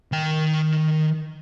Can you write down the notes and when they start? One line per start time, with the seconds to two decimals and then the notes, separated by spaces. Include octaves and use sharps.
0.12 D#3 G5